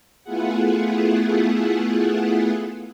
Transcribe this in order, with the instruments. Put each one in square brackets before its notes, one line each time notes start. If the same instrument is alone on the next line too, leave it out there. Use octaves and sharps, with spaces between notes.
[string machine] A3 B3 E4 F4 G#4 F#5